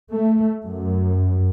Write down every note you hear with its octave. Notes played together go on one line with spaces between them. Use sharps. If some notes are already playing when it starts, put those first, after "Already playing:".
A3
F#2